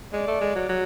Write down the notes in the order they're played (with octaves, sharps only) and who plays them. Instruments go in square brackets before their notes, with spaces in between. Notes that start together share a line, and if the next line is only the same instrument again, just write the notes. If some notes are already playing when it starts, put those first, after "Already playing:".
[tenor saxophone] G#3 [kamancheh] D5
[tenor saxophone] A3
G#3
F#3
F#3